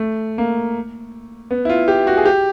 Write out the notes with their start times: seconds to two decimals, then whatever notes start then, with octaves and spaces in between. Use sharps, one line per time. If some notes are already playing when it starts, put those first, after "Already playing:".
Already playing: A3
0.38 A#3
1.51 B3
1.65 E4
1.69 F4
1.88 G4
2.07 F#4
2.17 G#4
2.25 G4